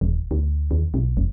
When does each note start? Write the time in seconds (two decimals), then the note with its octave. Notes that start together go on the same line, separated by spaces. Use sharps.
0.01 D#1
0.31 D2
0.71 D#2
0.94 B1
1.17 F1